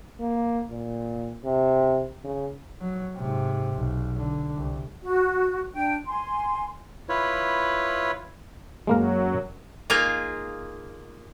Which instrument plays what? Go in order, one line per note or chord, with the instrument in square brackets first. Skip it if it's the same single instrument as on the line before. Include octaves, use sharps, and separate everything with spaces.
[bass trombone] A#3
A#2
C3
C#3
[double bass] F#3
G#2 C3
B1
D3
C2
[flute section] F#4
D4 G5
G#5 C6
[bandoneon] E4 F4 B4 C#5
[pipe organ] F#2 F#3 [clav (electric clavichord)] G#3 A#3 A#4
[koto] A#3 D#4 F4 G#4 F5 G#5